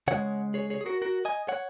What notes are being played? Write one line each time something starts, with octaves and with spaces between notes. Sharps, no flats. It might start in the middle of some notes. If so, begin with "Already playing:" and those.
C#3 G#3 C#5 F#5
G#4 C#5
G#4 C#5
G#4
F#4 A#4
F#4 A#4
D#5 G#5
C#5 F#5